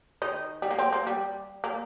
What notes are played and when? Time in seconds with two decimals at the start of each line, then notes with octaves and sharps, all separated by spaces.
0.22 D#3 D#4
0.62 G3
0.71 A#3
0.79 C4
0.93 A#3
1.07 G3
1.64 A#3